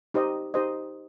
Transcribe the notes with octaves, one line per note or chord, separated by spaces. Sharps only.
D#4 G4 C5 D#5
D#4 G4 C5 D#5